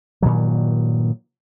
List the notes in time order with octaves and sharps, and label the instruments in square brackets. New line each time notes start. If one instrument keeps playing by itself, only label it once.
[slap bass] G2 A#2 D#3 F#3